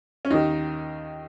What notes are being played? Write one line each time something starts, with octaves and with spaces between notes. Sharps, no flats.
C#4
D#2 D#3 D#4